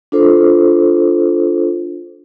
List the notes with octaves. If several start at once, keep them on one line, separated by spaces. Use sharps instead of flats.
D4 F4 A4 C5